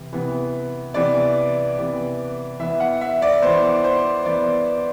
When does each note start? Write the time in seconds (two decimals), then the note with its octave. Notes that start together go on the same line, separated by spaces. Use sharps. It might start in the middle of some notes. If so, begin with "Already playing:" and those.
Already playing: C3 E3
0.12 C3 E3 B3
0.94 C3 E3 B3 D5
1.78 C3 E3 B3
2.60 E3 B3 E5
2.80 F#5
3.01 E5
3.22 D5
3.42 E3 B3 C5
3.84 C5
4.25 E3 B3 D5